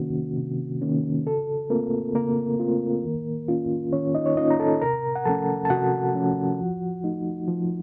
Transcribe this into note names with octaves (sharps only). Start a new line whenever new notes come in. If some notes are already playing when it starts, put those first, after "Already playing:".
Already playing: C3 D#3 A#3 C#4 F#4
C3
D#3 A#3 C#4
C#3 A4
A3 A#3 C4 F4 A#4
C#3 A#3 A#4
A3 C4 F4
D#3
A#3 C#4 F4
D#3 C#4 C#5
D#4 D#5
C#5
A#3 C#4 D#4 F4 D#5
A#5
A4 A5
C3 A#4 A#5
F#5
F3 A3 C#4 A4 A5
A5
C3 F#4 F#5
F3 A3 C#4
F3
A3 D#4
F3